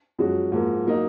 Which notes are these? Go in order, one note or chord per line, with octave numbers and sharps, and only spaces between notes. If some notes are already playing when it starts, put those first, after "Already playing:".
F#2 F3 G#3 C#4 F#4
G#2 F3 A#3
F#3 A#3 D#4